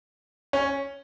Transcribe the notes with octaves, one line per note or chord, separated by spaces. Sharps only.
C#4